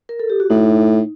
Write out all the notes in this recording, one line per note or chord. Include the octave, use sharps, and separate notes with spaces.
A#4
A4
G4
F#4
A2 D#4